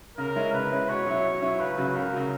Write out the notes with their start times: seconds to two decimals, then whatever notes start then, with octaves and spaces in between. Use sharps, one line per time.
0.17 C#3 A#4
0.36 G#3 C#4 E4
0.53 C#3 B4
0.71 G#3 C#4 E4
0.89 B2 C#5
1.06 F#3 C#4 E4
1.25 B2
1.42 F#3 C#4 E4
1.60 C#2 B4
1.78 C#3 F#3
1.95 C#2 A#4
2.13 C#3 F#3